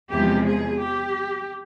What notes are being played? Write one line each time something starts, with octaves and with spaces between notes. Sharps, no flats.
E2 C3 F3 G#3 G4
G#4
G4